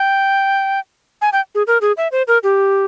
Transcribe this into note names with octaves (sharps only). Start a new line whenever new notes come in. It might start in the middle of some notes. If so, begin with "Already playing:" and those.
Already playing: G5
G#5
G5
G#4
A#4
G#4
E5
C5
A#4
G4